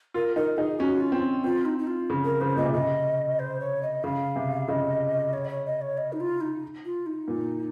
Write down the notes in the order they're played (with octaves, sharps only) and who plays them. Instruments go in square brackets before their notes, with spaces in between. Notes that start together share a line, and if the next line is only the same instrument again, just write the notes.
[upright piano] F4 [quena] A#4
[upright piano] D#4 [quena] A#4
[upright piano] D#4 [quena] G#4
[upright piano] C#4 [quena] F#4
[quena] F4
[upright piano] C4
[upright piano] C4 [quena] F4
[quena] D#4
D#4
F4
[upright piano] C#3
[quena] A#4
[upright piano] C#3 [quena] C5
[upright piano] A#2 [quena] D#5
[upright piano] C3
[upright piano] C#3 [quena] D#5
[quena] C5
C#5
D#5
[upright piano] C#3 [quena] F5
[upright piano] C3
[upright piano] C#3 [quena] D#5
[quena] C#5
D#5
C#5
D#5
C#5
D#5
D#4
F4
D#4
F4
D#4
[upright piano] A#2